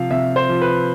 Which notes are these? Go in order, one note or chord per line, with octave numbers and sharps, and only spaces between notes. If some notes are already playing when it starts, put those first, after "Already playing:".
Already playing: C3 F3 F5
C3 E5
C5
F3
B4